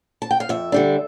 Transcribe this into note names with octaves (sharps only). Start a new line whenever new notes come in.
A5
G5
F5
F2 E5
D3 G3 D4